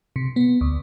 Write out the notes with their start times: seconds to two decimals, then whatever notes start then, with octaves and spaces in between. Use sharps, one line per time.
0.16 C3
0.36 B3
0.61 D2